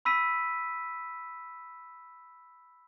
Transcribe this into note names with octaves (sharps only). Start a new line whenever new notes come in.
B5 E6 B6 D#7